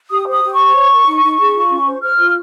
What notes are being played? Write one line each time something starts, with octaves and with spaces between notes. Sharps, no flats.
G4 D#6
C5
D#6
G4
C#6
C5
C#5
A#4
D#4
D#4
G#4
F4
C#4
C5
C5 F6
F4